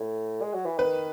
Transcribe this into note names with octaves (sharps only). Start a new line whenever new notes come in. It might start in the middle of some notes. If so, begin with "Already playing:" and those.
Already playing: A2
G#3
F#3
E3
D#3 B4